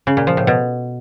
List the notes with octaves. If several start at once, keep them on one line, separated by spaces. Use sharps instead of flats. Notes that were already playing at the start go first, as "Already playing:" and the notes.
C#3
A#2
F3
A2
B2